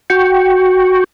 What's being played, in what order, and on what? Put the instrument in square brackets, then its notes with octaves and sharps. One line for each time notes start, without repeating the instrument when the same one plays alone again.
[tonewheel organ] F#4 G5 C#6